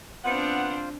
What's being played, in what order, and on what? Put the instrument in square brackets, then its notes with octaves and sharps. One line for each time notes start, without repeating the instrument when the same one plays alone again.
[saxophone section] B3 F#5 [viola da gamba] C4 D4 [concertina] F4 C5